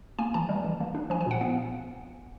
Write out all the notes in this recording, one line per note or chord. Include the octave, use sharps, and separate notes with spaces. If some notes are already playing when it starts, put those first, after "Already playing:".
A#3 G#5
E3 A5
G3
E3
A#3
D4
F3 G#5
G#5
A#2 F#5
B3 F5